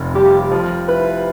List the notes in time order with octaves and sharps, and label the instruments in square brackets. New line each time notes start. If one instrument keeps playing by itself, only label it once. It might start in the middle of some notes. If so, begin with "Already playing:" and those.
Already playing: [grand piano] F1 F2
[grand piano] G3 [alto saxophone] G4
[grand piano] F3
[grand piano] E4 [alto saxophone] B4